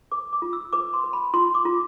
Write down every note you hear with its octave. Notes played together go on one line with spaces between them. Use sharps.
B4 D6
D6
F4
E6
B4 D6
C6
B4
B5
F4 C6
D6
F4